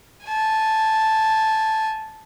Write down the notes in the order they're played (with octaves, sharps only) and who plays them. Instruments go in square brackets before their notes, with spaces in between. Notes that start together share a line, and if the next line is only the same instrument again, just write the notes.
[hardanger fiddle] G#5 A5